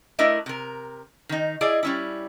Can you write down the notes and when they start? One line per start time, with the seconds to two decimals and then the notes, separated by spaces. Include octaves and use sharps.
0.19 A3 D4 E4 A#4 D#5 E5
0.46 C3 A#4
1.29 D#3 D#4
1.61 E4 G#4 D5 D#5
1.83 G3 C#4 E4